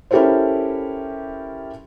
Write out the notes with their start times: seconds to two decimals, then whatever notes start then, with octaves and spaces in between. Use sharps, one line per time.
0.11 C#4 E4 G4 A4 A#4 C5